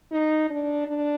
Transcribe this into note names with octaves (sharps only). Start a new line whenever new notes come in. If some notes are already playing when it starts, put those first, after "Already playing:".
D#4
D4
D4